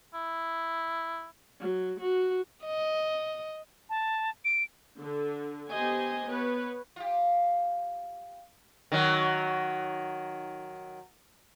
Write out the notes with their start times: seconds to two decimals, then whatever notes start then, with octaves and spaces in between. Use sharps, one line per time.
0.14 E4
1.61 F#3
1.99 F#4
2.64 D#5
3.90 A5
4.45 D7
5.00 D3
5.71 B3 G4 C5 D#5 G#5
6.27 B3 B4 C#5
6.96 F4 G4
8.92 D#3 F#3